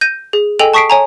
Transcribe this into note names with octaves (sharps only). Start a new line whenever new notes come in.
G6 A#6 D#7
G#4
A4 D#5 G5 G#5 F7 F#7
A5 C#6 D#6 B6 C7 D7
C#5 G#5 A#5